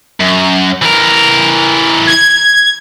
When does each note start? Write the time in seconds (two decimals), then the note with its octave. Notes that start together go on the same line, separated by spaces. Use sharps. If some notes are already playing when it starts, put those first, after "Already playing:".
0.20 F#2
0.82 E3 A#4
2.07 G#6